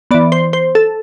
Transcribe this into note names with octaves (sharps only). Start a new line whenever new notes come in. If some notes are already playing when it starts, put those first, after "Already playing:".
E3 B3 D5
C5
C5
A4